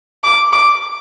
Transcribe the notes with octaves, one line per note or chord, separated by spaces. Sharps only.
D6
D6